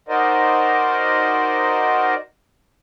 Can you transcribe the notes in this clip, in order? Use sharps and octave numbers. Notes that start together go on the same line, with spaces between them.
D#4 F#4 A#4 C5 D5 D#5